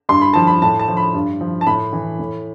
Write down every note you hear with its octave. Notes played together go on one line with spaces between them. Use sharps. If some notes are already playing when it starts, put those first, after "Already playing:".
G2 C6
B5
F3 A5
B5
A2 A5
A5
F3
B5
G2
F3
A5
A2 B5
E3
A2